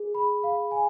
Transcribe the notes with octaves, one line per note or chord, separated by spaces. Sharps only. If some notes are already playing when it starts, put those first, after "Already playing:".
Already playing: G#4
B5
F5
G#5